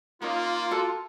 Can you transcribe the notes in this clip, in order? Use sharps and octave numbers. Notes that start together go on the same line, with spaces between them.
A#3 C#4 D#4 F4 A#4
F#4 A4 A5